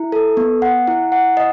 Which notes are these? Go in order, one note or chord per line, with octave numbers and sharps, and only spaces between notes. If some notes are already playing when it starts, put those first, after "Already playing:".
Already playing: E4
A4
B3
F#5
E4
F#5
D#5